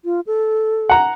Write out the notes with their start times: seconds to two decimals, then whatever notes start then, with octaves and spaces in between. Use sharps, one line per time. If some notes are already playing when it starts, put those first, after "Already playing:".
0.05 F4
0.27 A4
0.89 F#5 A#5